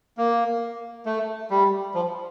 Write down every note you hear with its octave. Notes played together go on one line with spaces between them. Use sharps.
A#3
A3
G3
F3